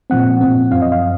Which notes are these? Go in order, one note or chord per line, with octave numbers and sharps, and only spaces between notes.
A#2 F3 C4 F#5
A#2 F3 C4
F#2 F3 C4 F5
D#5
F5